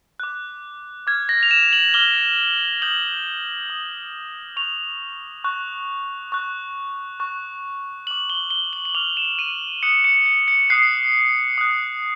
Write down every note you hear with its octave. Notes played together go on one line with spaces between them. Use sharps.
D6 F#6
D6 F6 G#6
A#6
F7
E7
F#7
D6 F6 G7
D#6 G6 F#7
D#6 G6
C#6 F#6 F7
C#6 F#6
C#6 F#6
C#6 F#6
D6 F6 F#7
G7
G7
F#7
F#7
D6 F6 F7
E7
D#7
D#6 F#6 C#7
C#7
C#7
C#7
D#6 F#6 C7
D#6 F#6